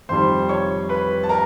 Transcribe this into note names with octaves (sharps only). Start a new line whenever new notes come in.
F2 C3 D#3 G3 C5 C6
C#5 C#6
B4 B5
A5
A#4 A#5